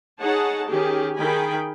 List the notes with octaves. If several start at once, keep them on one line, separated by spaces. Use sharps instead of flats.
D#4 G#4 C#5 F#5 A5
D#3 C#4 G4 G#4
D#3 G#4 G5 G#5 B5